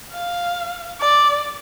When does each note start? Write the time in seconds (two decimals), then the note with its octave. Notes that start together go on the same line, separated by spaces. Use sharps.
0.12 F5
1.00 D5